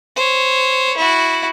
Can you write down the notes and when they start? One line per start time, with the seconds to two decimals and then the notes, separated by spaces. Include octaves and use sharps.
0.16 C5 C#5
0.97 E4 F#4